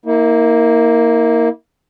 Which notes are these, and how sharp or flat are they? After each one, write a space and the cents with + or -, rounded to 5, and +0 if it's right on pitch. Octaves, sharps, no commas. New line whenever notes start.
A#3 +0 E4 -40